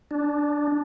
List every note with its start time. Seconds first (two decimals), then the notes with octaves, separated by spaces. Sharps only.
0.11 D4